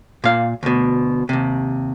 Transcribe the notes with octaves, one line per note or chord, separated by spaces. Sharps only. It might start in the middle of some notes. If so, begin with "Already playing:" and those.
A#2 F5
D2 B2
D#2 C3